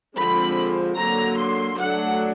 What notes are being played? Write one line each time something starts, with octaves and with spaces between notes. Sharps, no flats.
D3 F3 G#3 C4 B5
D3 F#3 A#3 A#5
C6
F#3 A3 D4 F#5